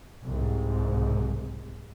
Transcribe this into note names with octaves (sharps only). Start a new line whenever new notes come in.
C2 G#2